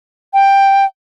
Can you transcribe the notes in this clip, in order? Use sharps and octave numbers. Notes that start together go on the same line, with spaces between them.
G5